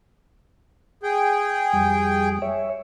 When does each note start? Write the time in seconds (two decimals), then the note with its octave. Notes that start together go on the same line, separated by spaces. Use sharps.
1.03 G#4 G5
1.73 F2 G3
2.42 C#5 E5